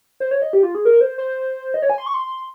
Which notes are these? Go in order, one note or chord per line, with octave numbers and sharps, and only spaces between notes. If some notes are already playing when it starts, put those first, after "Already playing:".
C5
C#5
D#5
G4
F4
G#4
A#4
C5
C5
D#5
C#5
G#5
C6
C#6
C6